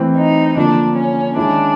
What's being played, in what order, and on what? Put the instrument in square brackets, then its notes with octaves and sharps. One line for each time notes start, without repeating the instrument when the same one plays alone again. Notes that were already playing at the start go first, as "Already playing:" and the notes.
Already playing: [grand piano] E3 A3 C4
[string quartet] D#4
[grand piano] D3 F3 A#3 [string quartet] D4
[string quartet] C#4
[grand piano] D#3 G#3 C#4 E4 [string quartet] D4